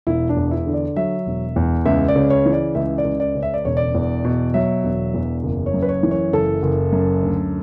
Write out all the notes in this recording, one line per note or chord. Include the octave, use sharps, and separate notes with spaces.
E1 E4
D4
E2
E4
D3
D5
F#3 E5
E1
E2
C#2 E5
D5
C#3
C#5
E3
D5
C#2 E5
D5
C#2
D5
C#3
E5
D5
E1 C#5
D5
E2
B2
F#3 E5
E1
E2
F#1
C#5
F#2
B4
C#5
E3
C#5
F#1 A4
F#1
F#2
D2